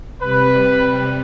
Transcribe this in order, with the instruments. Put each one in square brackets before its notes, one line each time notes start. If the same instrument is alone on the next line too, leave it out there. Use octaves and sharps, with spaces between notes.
[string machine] C3 G3 [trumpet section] B4